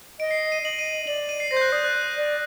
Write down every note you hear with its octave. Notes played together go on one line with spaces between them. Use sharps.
D#5 D7
C7
D#7
D#5 F#7
D#7
D5 F#7
F#7
D#7
C7
C5 A#6
G6
F#6
D5 D#6
F#6
D5